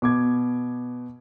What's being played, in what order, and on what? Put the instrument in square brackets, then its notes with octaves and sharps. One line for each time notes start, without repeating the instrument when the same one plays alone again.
[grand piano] B2 D6 G#6